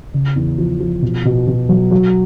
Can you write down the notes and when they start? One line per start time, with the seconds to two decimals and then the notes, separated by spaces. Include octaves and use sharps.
0.14 C#3
0.36 E2
0.58 F3
0.80 F3
1.02 B2
1.25 B2
1.47 B2
1.69 F#3
1.91 F#3